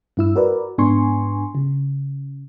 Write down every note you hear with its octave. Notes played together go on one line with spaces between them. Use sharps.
G2 E4 E6
F#4 A#4 B4 D5
G#2 B3 D4 G#5 C6 C#6
C#3